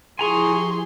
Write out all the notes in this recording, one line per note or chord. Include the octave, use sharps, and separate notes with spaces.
F3 E4 G4 G#4 G#5 A#5 C6 C#6